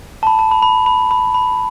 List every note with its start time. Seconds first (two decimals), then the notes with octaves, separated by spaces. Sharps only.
0.23 A5
0.27 B5
0.39 A5
0.51 B5
0.62 B5
0.86 B5
1.11 B5
1.34 B5